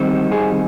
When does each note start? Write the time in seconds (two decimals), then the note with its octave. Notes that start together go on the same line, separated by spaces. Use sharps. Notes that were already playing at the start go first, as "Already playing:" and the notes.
Already playing: D#3 G3 C4 D#4
0.32 G#4